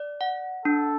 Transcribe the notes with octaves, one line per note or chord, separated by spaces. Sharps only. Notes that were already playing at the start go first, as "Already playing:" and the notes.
Already playing: D5
F#5
D4 A4